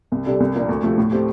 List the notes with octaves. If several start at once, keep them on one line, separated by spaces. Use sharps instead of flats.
C2
C3 G3 D4 A4
C2
A#2 F3 A#3 D4
D2
C3 F3 A3
A2
A3 C4 G4